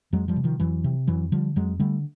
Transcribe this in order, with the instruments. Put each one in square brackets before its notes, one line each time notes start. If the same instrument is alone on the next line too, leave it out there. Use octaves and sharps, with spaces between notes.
[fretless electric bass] F2 F#3 G#3
F3 G3
C3
D#3 F3
F2 E3 F#3
C3
F2 E3 F#3
D3 F3 G3
F2 F#3 G#3
D3 G3 A3